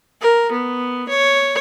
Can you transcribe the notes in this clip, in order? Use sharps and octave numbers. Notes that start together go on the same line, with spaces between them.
A#4
B3
C#5